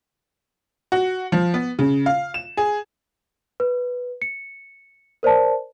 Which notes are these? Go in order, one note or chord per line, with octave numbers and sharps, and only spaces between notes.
F#4
F3
B3
C#3
F5
E7
G#4
B4
C#7
A#4 C5 D5 A5